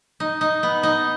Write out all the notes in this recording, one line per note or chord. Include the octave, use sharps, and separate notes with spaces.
D#4
D#4
B3
D#4